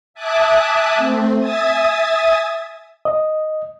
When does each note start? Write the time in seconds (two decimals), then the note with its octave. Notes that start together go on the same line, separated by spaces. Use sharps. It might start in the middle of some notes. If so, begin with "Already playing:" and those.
0.14 E5 G#5 A5 D6 D#6 F#6
0.95 A3 C4
1.39 E5 G#5 D#6 A6
3.05 D#5